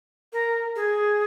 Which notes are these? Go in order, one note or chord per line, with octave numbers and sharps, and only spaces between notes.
A#4
G#4